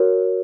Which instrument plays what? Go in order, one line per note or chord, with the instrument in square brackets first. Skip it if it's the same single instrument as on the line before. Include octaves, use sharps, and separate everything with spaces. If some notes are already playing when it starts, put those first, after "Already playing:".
Already playing: [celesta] F#4 A#4 C#5